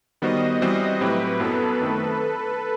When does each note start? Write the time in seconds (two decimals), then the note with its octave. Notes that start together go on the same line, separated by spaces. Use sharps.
0.22 D#3 G3 B3 F#4 C5 D#5
0.62 E3 G3 C4 F#4 C5 D#5
1.01 A2 F#3 C4 E4 G4 B4
1.40 F#2 F#3 B3 E4 A4
1.80 F#2 D#3 A3 C4